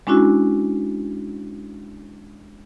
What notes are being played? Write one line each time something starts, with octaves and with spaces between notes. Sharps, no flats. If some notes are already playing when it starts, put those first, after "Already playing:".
G#3 C#4 D4 E4 F#4